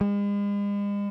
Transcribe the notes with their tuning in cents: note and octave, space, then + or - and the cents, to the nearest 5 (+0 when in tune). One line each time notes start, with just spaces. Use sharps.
G#3 -40